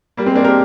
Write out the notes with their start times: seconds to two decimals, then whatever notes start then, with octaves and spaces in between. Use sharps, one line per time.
0.17 G3 A#3
0.26 G#3 C4
0.35 A#3 D4
0.44 G4 A#4